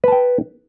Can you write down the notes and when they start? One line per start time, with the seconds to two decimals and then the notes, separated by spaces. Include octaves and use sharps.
0.04 B4
0.08 A5
0.12 G5